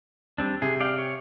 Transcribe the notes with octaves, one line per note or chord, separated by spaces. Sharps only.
G3 C4 D4
C3 G#4
D5 F5 G5
C#5